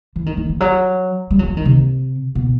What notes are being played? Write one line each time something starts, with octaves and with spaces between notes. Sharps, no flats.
E3
D#3
D#3
E3
F#3
G3
F#3
E3
D#3
C3
B2